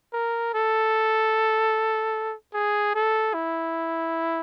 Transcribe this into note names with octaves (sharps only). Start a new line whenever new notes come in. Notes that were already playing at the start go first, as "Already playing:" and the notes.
A#4
A4
G#4
A4
E4